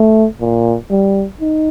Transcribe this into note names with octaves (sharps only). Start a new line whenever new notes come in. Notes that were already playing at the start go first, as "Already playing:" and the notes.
Already playing: A3
A#2
G3
D#4